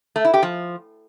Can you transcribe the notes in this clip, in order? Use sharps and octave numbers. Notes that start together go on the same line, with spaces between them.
A3
E4
G4
F3